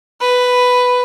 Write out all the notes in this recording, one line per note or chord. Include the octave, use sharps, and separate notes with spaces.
B4